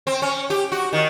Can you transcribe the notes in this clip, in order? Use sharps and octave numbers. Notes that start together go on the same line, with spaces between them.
C4
C#4
G4
F#4
D#3